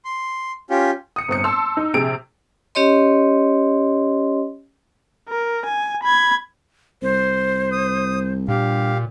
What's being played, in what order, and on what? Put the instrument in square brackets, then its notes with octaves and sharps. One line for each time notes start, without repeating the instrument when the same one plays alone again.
[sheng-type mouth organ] C6
C#4 F4 G4
[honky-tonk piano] D#6 C#7
G1 C4 D#6 C#7
A5 C6 E6
D#4
A#1 C3 G#4 D7
[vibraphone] C#4 G4 C#5 D#5 C6
[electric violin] A#4
G#5
B5 G#6
[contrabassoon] C2 [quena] C5
[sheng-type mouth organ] D#6
[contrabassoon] G2 [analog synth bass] A#2 [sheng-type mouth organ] G4 F5